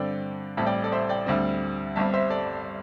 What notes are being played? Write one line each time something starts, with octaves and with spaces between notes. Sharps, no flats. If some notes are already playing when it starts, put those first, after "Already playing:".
Already playing: G2 D3 C4 D5 G5
A1 A2 G3 C4 E5 A5
D5 G5
A4 D5
C5 E5
D5 G5
D2 D3 G3 C4
G1 G2 G3 C4 E5 A5
C5 E5
A4 D5